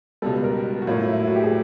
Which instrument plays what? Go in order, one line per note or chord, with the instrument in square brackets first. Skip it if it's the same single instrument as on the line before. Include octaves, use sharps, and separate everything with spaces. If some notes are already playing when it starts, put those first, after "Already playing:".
[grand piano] C#2 B2 G3 [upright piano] A4
[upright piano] B4
A#4
F#4
[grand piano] A2 F#3 A#3 [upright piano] F4
[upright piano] E4
E4
E4
F#4
G4
G#4